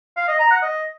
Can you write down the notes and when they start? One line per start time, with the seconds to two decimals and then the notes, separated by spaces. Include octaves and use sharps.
0.17 F5
0.28 D#5
0.39 A#5
0.51 F#5
0.62 D#5